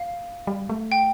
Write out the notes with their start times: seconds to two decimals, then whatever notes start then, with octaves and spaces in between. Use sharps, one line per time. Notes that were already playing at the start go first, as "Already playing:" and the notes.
Already playing: F5
0.47 G3
0.69 A3
0.92 G5